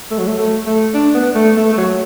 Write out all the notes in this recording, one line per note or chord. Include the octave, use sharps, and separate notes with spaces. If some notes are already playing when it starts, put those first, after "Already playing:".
A3
F#3
A3
A3
A3
D4
B3
A3
A3
A3
F#3